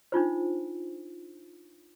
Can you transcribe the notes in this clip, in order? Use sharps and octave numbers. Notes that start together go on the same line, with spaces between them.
D4 D#4 F4 C5